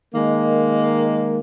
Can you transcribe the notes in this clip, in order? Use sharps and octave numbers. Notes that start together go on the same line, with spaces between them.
D#3 G#3 A#3